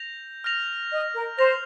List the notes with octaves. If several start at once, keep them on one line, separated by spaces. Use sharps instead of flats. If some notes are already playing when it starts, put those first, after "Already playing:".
Already playing: G6 A#6 F7
F6 A#6 F7
D#5
A#4
C5 A#6 F7